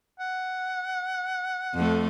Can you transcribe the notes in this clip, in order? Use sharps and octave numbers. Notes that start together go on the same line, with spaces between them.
F#5
F2 A3